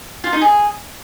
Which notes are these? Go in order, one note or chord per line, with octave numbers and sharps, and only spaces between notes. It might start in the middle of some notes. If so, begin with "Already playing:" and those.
F4
D#4
G#4